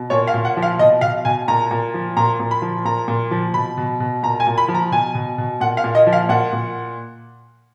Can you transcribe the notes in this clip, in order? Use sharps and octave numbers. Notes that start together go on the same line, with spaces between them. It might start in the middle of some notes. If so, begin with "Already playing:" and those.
Already playing: B2
A#2 C#5
F5
A#2
F#5
F3
F5
B2 D#5
B2 F5
B2 G#5
A#2 A#5
A#2
F3
A#2 A#5
A#2
B5
F3
A#2 A#5
A#2
F3
B2 B5
B2
B2
A#2 A#5
G#5
A#2
B5
F3
A#5
B2 G#5
B2
B2
A#2 F#5
F5
A#2
D#5
F3
F5
A#2 F#5
A#2